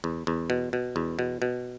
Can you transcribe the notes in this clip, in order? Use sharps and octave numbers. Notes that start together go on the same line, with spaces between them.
E2
E2
B2
B2
E2
B2
B2